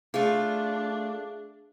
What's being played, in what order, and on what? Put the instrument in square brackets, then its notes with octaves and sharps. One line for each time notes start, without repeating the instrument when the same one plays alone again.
[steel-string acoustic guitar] A3 F4 [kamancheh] D4 [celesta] G#4